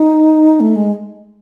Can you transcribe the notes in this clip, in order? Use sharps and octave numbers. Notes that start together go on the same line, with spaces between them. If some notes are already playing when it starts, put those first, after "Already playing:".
Already playing: D#4
A3
G#3